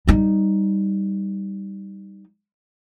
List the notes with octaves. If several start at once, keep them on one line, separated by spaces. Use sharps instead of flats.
G3 D#4